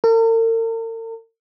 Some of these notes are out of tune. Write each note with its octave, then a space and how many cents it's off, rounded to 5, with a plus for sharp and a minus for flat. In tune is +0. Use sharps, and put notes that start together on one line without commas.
A#4 -45